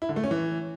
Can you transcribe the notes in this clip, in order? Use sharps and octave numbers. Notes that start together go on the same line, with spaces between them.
E4
D3
A3
C#4
E3